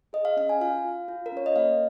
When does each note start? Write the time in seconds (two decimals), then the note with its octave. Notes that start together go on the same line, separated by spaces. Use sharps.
0.13 G#4 D#5
0.25 F5
0.37 C#4 F5
0.49 G#5
0.61 F4 F5
0.84 F4
1.08 F4
1.26 A#4
1.32 C#4 C#5
1.46 D#5
1.56 A#3 F5